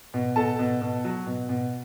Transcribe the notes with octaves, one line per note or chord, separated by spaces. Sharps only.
B2
B2 A4 A5
B2
B2
F#3
B2
B2